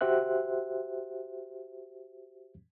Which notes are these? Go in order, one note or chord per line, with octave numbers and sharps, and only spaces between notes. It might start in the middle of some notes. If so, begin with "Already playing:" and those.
F#4 G4 C5 E5 F#6